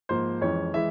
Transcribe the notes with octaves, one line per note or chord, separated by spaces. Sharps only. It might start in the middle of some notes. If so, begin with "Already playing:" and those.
G#2 F3 A#3 C5
F2 E3 G#3 C#4 C#5
E3 G#3 E5